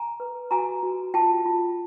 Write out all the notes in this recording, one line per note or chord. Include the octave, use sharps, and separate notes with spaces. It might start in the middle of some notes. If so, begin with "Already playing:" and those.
Already playing: G#5 A#5
B4
F#4 G#5 A#5
F#4
F4 G5 A5
F4